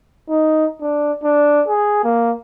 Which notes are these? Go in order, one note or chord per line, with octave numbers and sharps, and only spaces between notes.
D#4
D4
D4
G#4
A#3